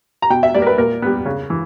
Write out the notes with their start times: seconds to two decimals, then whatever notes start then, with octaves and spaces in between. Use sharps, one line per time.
0.22 A#5
0.30 B2 G5
0.43 E5
0.55 G3 A#3 D5
0.62 A#4
0.67 B4
0.78 A#2 A#4
1.02 G3 B3
1.26 C#3
1.50 E3